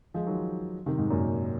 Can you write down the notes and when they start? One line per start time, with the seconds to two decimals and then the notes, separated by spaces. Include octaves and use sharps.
0.14 F3 G#3
0.26 D#3 F#3
0.86 C3 D#3
0.98 G#2
1.10 F#2 A#2